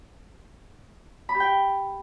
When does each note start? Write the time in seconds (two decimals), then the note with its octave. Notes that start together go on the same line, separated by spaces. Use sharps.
1.29 B5
1.34 G4
1.40 G5